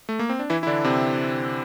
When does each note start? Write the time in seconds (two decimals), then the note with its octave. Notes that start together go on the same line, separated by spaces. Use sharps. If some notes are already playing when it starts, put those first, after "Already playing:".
0.09 A3
0.19 A#3
0.29 C4
0.39 D4
0.50 E3 E4
0.63 E4
0.67 D3 D4
0.84 C3 C4